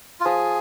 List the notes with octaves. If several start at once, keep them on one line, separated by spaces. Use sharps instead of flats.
F4
F3 G#4